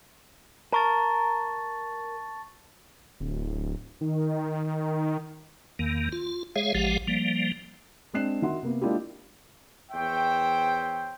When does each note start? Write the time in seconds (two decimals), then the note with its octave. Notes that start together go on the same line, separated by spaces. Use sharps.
0.72 A#4 A5 C#6 A6
3.20 D1
4.01 D#3
5.79 E2 D#3 A#3
6.12 F4
6.56 G#3 G#4 C#5 E5 F5
6.75 A1 F3 G#3 G4 F5 F#5
7.07 F3 G3 A#3
8.14 G#3 C4 D4 F#6 C7 E7
8.42 D#3 F#4 E5 F#5 C6
8.63 C3 A#3 B3
8.81 G#3 A#3 D4 E4 F4 G4
9.92 E2 C5 C#5 E5 G5